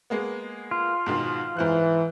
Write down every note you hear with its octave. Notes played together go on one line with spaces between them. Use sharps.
G#3 A#3 B3
F4
G#2 B2 D#3
G#2 E3 C5 F#6